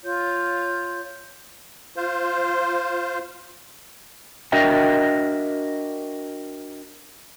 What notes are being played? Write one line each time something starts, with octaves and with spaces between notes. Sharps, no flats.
F4 C#5 G6
F4 C5
D4 F#4 A#4 D#5 E5 G5